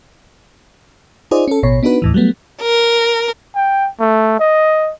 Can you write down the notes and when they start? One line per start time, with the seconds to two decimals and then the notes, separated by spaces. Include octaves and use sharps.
1.31 D#4 F4 G#4 C5 D5 D#5
1.48 C#4 A4
1.63 A1 B2 C#5
1.83 B3 D4 D#4 F#4 B4
2.02 D#2 A2 E3
2.14 F#3 G3 A3 B3
2.62 A#4
3.55 G5
4.00 A3
4.39 D#5